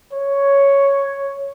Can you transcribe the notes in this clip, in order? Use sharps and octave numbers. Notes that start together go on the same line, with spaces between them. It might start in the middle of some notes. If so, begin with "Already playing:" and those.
C#5